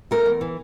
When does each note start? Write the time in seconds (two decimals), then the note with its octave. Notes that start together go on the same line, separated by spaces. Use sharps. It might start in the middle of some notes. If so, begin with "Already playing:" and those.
0.11 A3 A#4
0.26 E2
0.41 E3